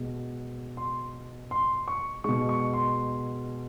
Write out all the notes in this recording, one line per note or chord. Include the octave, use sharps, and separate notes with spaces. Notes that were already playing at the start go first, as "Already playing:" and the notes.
Already playing: B2 G#3
C6
C6
C#6
B2 G#3 C#6
C#6
C6